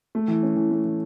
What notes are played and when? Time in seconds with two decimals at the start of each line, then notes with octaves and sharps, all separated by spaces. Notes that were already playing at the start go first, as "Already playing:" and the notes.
0.15 A3
0.28 E3
0.43 C#4
0.56 E3
0.71 A3
0.85 E3